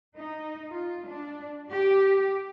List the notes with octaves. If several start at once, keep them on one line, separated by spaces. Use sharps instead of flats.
D#4
F4
D4
G4